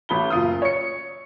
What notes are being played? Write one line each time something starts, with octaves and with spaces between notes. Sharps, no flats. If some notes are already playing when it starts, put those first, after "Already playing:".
A1 B5 G7
F#1 F4 D#6
C#5 C#7